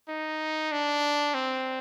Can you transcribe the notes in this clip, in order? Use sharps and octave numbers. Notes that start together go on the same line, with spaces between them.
D#4
D4
C4